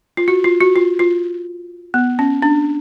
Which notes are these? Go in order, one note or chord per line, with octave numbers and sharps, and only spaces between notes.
F4
F#4
F4
F#4
F4
F4
B3
C#4
D4